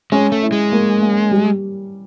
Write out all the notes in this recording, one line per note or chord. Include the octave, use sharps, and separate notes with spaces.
G#3 C#4
A3
E4
G#3
A#3
A#3
G3